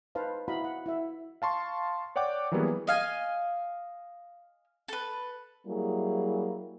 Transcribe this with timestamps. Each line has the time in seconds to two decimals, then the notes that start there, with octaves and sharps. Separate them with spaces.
0.15 D#4 B4 C5 F5 A5
0.48 E4 F#4 D#5 F5 A#5 B5
0.64 F#5
0.86 E4 E5
1.42 F5 A5 C6 C#6
2.16 C#5 D5 F#5 G5 D6
2.52 E3 F#3 G3 A#3 B3 G#4
2.87 D#5 F5 G#5
4.88 A4 B4
5.67 F#3 G3 A#3 E4 G#4